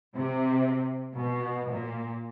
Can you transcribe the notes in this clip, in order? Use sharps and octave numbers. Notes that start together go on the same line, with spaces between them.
C3
B2
A#2